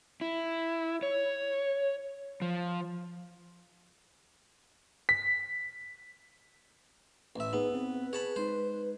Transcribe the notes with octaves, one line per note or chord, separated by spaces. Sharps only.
E4
C#5
F3
B6
A1 E5
B3 D#4 G#4 B4
C4 B4
G#4 C#5 A5 B5
G#3 D#4 C5